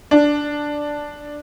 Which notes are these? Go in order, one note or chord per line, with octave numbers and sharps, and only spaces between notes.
D4